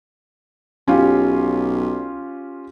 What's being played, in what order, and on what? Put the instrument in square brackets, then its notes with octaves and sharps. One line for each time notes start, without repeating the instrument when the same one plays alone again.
[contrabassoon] B1 [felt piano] C#4 F4 G4